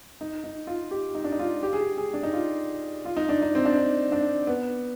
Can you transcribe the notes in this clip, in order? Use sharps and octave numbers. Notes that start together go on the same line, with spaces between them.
D#4
D#4
F4
G4
D#4
D4
D#4
F4
G4
G#4
G4
G#4
D4
D#4
F4
F4
D#4
D4
D#4
C4
D4
D#4
D4
B3